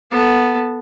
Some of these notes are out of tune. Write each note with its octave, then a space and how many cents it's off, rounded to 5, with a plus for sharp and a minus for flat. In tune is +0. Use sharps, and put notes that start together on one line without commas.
B3 -5 A4 +5